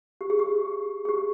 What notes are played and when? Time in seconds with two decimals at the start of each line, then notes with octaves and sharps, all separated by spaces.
0.21 G4
0.30 G#4
0.39 G4
1.05 G#4
1.09 G4